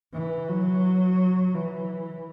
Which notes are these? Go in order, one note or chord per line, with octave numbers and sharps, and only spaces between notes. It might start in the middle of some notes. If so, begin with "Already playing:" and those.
E3
F#3
E3